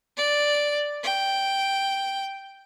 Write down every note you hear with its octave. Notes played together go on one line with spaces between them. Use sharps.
D5
G5